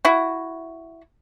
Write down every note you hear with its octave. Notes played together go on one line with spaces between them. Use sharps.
E4 F#4